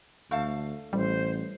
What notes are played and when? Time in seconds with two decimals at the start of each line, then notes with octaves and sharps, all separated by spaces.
0.31 D2 A3 F5 A5
0.93 A1 G3 C5